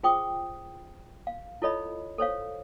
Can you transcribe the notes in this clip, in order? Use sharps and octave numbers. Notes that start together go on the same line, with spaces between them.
F4 G#4 C5 G5 C#6 D#6
F5
E4 F4 A4 C#5 D#5 B5
A4 C5 C#5 F5